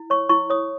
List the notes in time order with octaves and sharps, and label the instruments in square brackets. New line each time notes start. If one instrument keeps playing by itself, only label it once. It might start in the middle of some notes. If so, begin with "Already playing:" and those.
Already playing: [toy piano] E4
C#5 C#6
E4 C#6
C#5 D#6